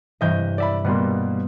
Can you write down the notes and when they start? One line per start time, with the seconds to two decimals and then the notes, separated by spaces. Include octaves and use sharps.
0.21 G2 C3 E3 D#5 G6
0.58 D5 E5 B5
0.85 B2 G3 A#3 B3 C6